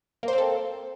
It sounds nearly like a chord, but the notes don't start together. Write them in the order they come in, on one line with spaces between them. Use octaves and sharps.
A#3 C5 C4 A4